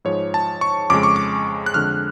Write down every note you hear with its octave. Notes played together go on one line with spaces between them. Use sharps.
G#2 F3 G#3 C#5
A5
C#6
F2 C#3 G#3 D6
C#6
D6
F#6
F2 D3 G#3 F6